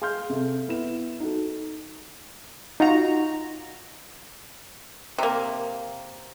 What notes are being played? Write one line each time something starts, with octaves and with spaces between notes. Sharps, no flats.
G#4 F5 C6 F6 G6
C3 A4
B3 E4 E7
D#4 F#4 A4
D#4 F4 F#4 A#5
C3 A#3